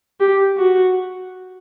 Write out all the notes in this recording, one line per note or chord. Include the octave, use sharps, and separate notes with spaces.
G4
F#4